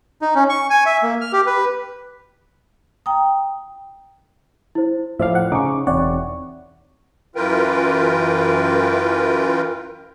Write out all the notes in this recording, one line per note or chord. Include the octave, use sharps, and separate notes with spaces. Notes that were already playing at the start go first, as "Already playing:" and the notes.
D#4
C#4
C#6
G#5
E5
A#3
F6
G4
B4
G5 A#5 D#6
E4 C5
A2 F3 C5 D5 E5 F5
F#5
C#3 D#4 C#6 D6
E1 E3 C4 C#5 D5 F#5 C#6
F#2 E3 F4 A#4 B4 G5